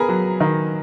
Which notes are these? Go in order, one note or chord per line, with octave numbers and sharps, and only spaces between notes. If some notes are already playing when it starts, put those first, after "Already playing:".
Already playing: B3 G#4 A#4 G#5 A#5 B5
F#3
D#3